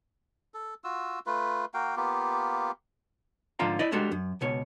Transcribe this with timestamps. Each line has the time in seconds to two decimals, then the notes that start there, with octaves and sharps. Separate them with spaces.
0.54 A4
0.84 F4 F#4 E6
1.26 A3 F4 B4
1.74 A#3 F#4 F5 G5
1.97 A#3 B3 F4 G4
3.59 G#2 D3 F3 F4 F5 A#5
3.79 E4 D5 D#5
3.92 G3 G#3 D4 F#4 A4
4.12 F#2
4.41 C#2 B2 C#5